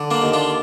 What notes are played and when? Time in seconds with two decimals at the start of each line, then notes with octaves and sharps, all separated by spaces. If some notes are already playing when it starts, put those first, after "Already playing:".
Already playing: D3
0.11 A#3 D4
0.22 D#2
0.34 D4 F4